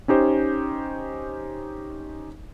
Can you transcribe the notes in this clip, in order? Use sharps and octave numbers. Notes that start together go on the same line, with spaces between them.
C#4 D#4 G4 C5